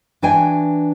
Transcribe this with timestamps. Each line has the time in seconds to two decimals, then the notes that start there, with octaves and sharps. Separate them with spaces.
0.22 E3 D4 F#4 G5 G#5